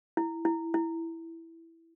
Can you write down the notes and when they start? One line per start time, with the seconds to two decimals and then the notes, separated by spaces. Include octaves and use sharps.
0.17 E4
0.45 E4
0.74 E4